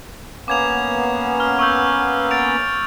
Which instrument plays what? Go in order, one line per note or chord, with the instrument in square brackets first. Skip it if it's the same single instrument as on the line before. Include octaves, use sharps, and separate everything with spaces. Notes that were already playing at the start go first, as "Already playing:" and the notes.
[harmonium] A#3 B3 C#4 [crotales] D6 G#6 F7
[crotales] F6
C#6 E6 G6
A6 D7 F7